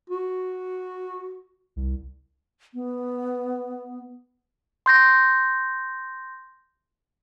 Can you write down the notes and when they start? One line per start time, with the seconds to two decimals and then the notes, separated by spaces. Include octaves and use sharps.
0.10 F#4
1.76 C2
2.74 B3
4.86 C6 G6 A#6